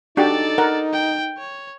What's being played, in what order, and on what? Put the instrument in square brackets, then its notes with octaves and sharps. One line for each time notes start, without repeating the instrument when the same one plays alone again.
[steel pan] D4 F#4 G4 [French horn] D#4 [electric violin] A4 D5
[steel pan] A#4 F#5
[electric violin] G5
C#5